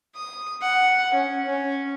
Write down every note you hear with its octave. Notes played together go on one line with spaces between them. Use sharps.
D#6
F#5
C#4
C#4